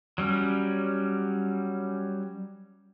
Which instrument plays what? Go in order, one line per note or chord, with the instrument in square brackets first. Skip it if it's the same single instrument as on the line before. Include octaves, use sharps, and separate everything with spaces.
[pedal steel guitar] F#3 G3 C#4